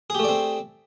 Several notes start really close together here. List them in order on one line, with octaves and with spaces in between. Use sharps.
G#4 G4 A3 D5 C4